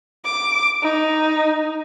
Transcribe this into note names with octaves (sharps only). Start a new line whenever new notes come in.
D6
D#4